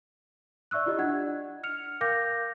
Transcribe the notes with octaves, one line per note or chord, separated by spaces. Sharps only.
D5 E5 C#6 E6 F#6
E4 F4 G4 D5 D#5
D4 F#5 G#6
F6 C#7 F7
A#4 F5 G5 D6 G6 A#6